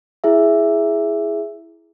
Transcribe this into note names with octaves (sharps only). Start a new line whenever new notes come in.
E4 G#4 E5